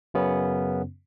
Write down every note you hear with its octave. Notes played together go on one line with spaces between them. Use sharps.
F#2 C#3 B3 C#4